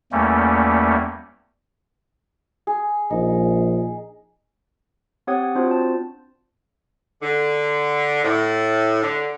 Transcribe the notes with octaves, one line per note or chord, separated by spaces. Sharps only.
E2 G3 A3 A#3 C#4
G#4
A#1 D#4
C4 G4 C#5 F#5 D#6 G#6
C4 D4 F4 F#4 C5
A5
D3
A2
D3